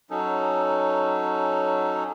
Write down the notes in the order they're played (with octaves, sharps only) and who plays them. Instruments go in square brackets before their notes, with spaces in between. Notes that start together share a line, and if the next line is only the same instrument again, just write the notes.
[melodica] F#3 C#4 D#4 A4